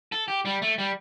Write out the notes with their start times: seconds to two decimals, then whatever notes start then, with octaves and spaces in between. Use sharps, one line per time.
0.12 A4
0.28 G4
0.45 G3
0.62 A3
0.78 G3